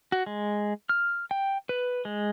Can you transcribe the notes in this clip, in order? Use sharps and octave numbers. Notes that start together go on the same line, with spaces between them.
F#4
G#3
F6
G5
B4
G#3